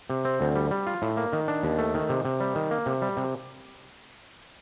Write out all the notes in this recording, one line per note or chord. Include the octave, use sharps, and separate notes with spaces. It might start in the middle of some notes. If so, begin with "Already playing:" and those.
C3
C4
D2
G3
G3
F4
A2
A#3
D#3
D4
D#2
A3
D#3
C3
C3
G3
D#3
A#3
C3
G3
C3